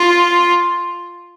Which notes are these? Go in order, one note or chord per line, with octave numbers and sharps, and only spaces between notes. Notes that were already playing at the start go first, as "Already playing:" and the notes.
Already playing: F4